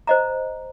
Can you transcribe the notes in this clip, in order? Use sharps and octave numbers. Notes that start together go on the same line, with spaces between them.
C5 D#5 A#5